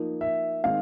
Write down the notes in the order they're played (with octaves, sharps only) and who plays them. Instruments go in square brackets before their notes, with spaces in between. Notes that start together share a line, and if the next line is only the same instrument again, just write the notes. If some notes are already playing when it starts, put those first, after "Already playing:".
Already playing: [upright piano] F3 A#3 D#4
[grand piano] E5
[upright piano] D#3 G#3 C4 D#4 [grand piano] F5